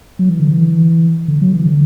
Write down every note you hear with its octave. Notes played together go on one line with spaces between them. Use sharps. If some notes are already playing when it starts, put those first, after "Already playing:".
F#3
E3
D3
E3
D3
F#3
E3
D3